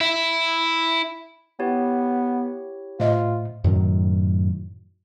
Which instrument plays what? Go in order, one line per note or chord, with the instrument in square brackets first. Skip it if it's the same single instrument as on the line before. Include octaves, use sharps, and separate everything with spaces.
[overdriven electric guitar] E4 E5
[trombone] B3 [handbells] E4 G4 C#5
[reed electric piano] A2 [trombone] F4 [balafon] C5 D#5 E5
[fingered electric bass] F#2 A2 D#3 F#3